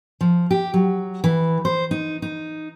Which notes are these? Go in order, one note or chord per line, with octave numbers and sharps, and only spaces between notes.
F3
G4
F#3
E3
C5
D#4
D#4